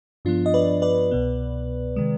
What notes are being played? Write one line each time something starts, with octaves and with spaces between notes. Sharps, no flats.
G2 F3 B3 D4 F4
D#5
B4 D5
B4 D5
C2 B2 B3
C3 D#3 G#3